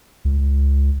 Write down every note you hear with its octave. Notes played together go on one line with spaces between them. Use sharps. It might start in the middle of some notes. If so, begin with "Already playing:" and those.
C#2